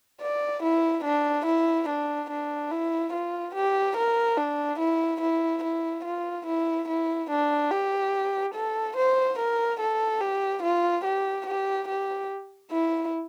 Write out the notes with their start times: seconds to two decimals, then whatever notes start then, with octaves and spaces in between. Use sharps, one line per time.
0.21 D5
0.62 E4
1.04 D4
1.46 E4
1.89 D4
2.30 D4
2.71 E4
3.13 F4
3.55 G4
3.97 A#4
4.38 D4
4.79 E4
5.21 E4
5.63 E4
6.05 F4
6.47 E4
6.88 E4
7.30 D4
7.71 G4
8.54 A4
8.96 C5
9.39 A#4
9.80 A4
10.21 G4
10.63 F4
11.04 G4
11.47 G4
11.88 G4
12.71 E4